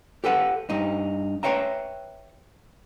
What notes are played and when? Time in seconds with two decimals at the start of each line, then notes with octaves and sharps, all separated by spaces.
0.24 G4 A4 B4 F#5
0.70 G2 D#4
1.43 B4 C#5 E5 G5 A#5